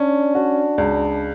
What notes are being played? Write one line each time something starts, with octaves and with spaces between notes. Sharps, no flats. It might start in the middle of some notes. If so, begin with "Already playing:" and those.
Already playing: C#4 D4
D4 F#4
C#2 D4